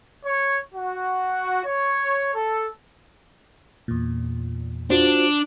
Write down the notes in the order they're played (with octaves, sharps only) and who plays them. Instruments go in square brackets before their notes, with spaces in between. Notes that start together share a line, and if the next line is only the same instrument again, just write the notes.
[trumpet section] C#5
F#4
C#5
A4
[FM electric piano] E2 A#2
[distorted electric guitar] D4 [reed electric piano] F4 F#4 C5